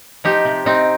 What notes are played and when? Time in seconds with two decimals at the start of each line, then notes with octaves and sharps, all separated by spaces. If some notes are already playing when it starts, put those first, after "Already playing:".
0.24 F3 D#4 G4
0.45 C3
0.65 C3 C4 D#4